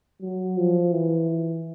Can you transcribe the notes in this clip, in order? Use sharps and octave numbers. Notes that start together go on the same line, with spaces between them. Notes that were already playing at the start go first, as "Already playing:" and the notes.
F#3
F3
E3